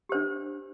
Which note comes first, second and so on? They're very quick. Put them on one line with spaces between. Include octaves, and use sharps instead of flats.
G4 C5 D4